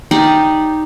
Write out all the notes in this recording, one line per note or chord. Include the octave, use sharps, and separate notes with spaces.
D#4 G4 D5